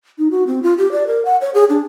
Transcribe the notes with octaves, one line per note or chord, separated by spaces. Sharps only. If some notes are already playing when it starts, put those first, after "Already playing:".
D#4
F#4
C4
F4
G4
D5
A#4
F#5
C#5
G#4
D4